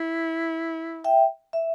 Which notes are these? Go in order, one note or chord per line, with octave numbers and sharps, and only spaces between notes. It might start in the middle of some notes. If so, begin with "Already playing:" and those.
Already playing: E4
E5 G5
E5